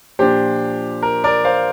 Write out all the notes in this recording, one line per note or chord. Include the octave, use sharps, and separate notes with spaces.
A#2 F3 D4 G4 C5
A#4
A#4 D5
C5 F5